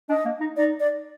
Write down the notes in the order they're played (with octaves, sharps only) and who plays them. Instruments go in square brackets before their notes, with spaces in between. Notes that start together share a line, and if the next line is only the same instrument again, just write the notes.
[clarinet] D4 [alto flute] D#5
[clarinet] A#3
D#4
[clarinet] D#4 [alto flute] D5
[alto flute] D5